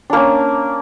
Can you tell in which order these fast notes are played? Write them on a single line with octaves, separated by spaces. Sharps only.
D4 A#3 C#4